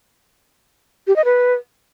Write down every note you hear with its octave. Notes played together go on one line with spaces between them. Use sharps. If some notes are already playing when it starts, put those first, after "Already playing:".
G4
D#5
B4